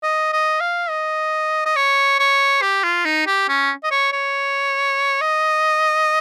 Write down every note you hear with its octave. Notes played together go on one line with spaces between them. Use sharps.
D#5
D#5
F5
D#5
D#5
C#5
C#5
G4
F4
D#4
G4
C#4
D#5
C#5
C#5
D#5